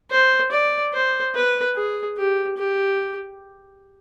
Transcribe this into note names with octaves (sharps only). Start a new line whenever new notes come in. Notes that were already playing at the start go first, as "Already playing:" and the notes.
C5
D5
C5
B4
G#4
G4
G4